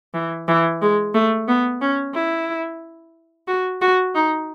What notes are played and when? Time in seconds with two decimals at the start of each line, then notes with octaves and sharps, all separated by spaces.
0.14 E3
0.48 E3
0.82 G#3
1.14 A3
1.48 B3
1.81 C#4
2.14 E4
3.48 F#4
3.81 F#4
4.15 D#4